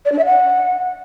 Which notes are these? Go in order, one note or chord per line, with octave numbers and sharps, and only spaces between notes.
D5
D4
E5
F#5